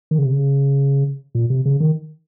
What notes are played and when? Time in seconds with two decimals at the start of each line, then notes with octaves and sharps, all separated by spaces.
0.11 D#3
0.18 C#3
0.25 C3
0.32 C#3
1.35 A#2
1.50 C3
1.65 C#3
1.80 D#3